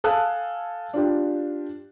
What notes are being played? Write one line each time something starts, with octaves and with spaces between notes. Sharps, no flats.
A4 F5 G#5 A5 D#6 F#6
D4 F4 G4